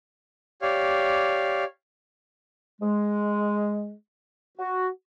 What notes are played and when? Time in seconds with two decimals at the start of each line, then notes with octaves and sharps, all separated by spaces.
0.62 G4 C#5 D5 F5
2.81 G#3
4.58 F#4